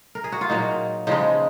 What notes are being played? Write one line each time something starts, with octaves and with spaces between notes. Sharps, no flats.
A#4
G#4
F#4
F4
A#2 F#3 A#3 D#4
C#3 F3 G#3 D#4